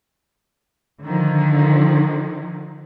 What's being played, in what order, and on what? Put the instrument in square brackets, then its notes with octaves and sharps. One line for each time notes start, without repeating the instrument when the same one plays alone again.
[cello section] D3 D#3 F3